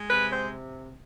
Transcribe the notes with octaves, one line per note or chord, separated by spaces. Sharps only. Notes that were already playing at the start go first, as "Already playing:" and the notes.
Already playing: G#3
C3 B4
C5